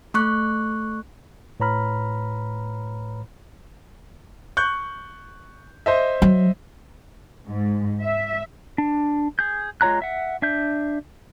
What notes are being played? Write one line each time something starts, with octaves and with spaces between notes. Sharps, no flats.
A3 C#6 F#6
A2 B4 C#5 A#5 B5 F6
C#6 F#6 G6
C5 D#5 E5
F#3
G#2
E5
D4
G#4 G6
G#3 F4 C#5 A#5 F#6
E5 F#5
D4 E5 G6